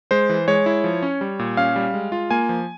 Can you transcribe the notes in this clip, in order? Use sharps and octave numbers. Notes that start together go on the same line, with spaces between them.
G#3 C5
E3
G#3 C#5
E4
F3
C#4
G3
A#2
C#4 F5
G3
G#3
F4
A#3 G#5
F3